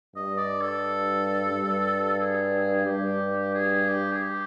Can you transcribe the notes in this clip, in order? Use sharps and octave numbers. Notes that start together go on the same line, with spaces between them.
G2 D#5
D5
A4
G2
G#4
G2 G4
G#4
G4
G#4
G4